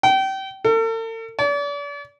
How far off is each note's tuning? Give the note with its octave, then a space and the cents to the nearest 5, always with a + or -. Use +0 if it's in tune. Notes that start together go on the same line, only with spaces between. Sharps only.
G5 -30
A4 +45
D5 -40